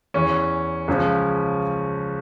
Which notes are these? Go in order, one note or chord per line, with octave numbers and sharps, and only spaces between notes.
E2 E3 C#4
C#2 C#3 F3